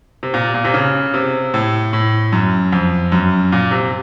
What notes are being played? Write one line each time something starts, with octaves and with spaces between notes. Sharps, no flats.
C3
A#2
A#2
C3
C#3
C3
A2
A2
F#2
F2
F#2
A#2
C3